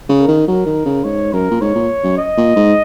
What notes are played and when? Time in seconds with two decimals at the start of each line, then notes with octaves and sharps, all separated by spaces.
0.09 C#3
0.19 A#4
0.28 D#3
0.47 F#3 A#4
0.66 D#3
0.85 C#3
1.04 G#2 C#5
1.33 F#2 A#4
1.50 A#2
1.61 G#2 C#5
1.75 A#2
2.04 F#2
2.17 D#5
2.37 A#2
2.56 G#2